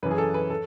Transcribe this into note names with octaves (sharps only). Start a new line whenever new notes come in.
F#2 E3 B4
G#4
A4
B4
A4